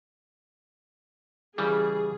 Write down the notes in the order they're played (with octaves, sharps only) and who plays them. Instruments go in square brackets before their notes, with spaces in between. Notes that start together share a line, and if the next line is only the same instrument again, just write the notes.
[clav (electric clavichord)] C#3 E3 G3 [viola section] G#4